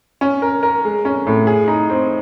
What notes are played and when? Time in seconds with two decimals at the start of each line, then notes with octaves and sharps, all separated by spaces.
0.21 C#4
0.42 A#4
0.63 A#4
0.85 G#3
1.05 C#4
1.27 A2
1.47 G#4
1.68 D#4
1.90 C4